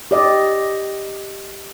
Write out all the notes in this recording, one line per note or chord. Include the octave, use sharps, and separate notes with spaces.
G4 D5 D#5